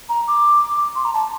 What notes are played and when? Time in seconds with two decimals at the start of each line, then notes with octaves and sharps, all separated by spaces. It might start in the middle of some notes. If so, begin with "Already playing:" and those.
0.09 A#5
0.28 D6
0.96 C6
1.05 A#5
1.14 A5